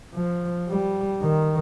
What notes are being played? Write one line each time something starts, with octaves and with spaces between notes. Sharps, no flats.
F3
G3
D#3